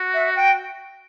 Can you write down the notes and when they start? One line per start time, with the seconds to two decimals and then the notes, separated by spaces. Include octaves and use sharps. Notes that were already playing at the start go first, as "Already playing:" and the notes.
Already playing: F#4
0.14 E5
0.36 G5